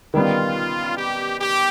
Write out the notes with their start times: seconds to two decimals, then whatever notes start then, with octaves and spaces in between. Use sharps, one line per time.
0.14 D#3 G3 B3 F4
0.96 G4
1.39 G4